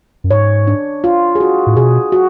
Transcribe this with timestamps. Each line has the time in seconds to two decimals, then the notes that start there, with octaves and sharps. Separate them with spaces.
0.24 F#2
0.31 G#2 C#5
0.67 D4
1.04 F4
1.35 G#4
1.40 F#4
1.67 A2
1.77 B2 G#4
2.12 F#4